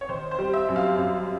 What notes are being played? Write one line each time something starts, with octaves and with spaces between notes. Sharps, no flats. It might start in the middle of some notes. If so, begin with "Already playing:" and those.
C#5
D#3 C5
C5
G3
E5
F#2
F5
F#2